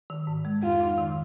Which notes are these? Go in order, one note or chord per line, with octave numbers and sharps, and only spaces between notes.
D#3
G#2
G#3
F2 F4
D#4
D#3